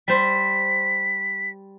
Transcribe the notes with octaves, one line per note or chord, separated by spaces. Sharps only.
G3 C5 B6